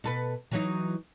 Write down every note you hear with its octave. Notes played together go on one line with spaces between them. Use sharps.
B2 A4 B4
E3 F#3 D#4